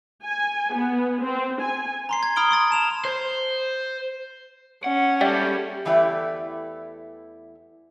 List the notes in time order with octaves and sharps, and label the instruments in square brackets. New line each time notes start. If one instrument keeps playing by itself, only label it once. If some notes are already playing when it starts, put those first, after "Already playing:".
[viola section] G#5
B3
C4
G#5
[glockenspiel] A#5 C6 C7
G#6
A#5 B5 D#6 F6 D7 G7
C6 D#6 A6
A5 E7 F7
[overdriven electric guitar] C5
[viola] C#4 [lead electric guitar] F#5
[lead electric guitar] G#2 A4 [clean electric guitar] G3 [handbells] D5 E5 G5
[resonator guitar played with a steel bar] E2 E3 A3 E4 G4 D5